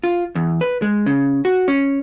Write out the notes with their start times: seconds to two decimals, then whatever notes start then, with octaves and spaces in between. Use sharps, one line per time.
0.04 F4
0.35 E2
0.61 B4
0.82 G#3
1.06 C#3
1.45 F#4
1.68 C#4